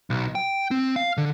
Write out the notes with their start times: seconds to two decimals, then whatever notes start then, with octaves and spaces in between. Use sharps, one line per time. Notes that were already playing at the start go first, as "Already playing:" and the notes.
0.10 B1
0.35 G5
0.71 C4
0.96 F5
1.17 D3